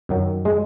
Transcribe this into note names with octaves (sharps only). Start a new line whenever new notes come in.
F#2 D#3 F#3
G#3